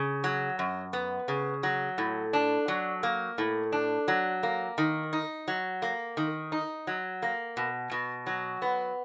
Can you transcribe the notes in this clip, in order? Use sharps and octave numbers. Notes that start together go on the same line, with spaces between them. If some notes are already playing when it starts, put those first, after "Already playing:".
Already playing: C#3
F#3
F#2
B3
C#3
F#3
A2
D4
F#3
A#3
A2
D4
F#3
A#3
D#3
D#4
F#3
A#3
D#3
D#4
F#3
A#3
B2
B2
F#3
B3